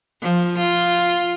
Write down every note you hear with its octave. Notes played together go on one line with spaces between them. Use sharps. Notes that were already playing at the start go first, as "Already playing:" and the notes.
F3
F4